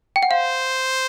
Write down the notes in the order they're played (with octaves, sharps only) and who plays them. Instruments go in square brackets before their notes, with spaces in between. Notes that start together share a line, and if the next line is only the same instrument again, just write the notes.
[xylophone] G5
F#5
[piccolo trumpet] C5 [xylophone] F5